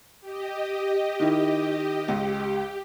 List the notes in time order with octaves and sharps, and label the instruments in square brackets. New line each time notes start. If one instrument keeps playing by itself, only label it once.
[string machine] G4 D#5
[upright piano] D#3 E4
[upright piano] C#2 [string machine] G4